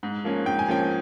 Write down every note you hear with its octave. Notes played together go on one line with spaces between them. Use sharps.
G#2
F3 A#3 C#4
G#2 G5
G#5
F3 A#3 C#4 G5